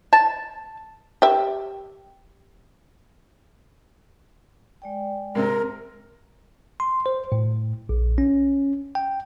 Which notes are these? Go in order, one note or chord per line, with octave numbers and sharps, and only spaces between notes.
A5
G4 E5
G#3 D5 G5
G#2 C3 C4 A#4
C6
C5
A2
A#1
C#4
G5